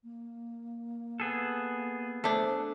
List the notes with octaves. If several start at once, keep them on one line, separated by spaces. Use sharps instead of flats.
A#3
B3 G#4 A4
A3 D4 C5